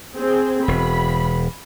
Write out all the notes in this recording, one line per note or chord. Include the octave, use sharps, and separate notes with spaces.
C4 G#4
E1 B5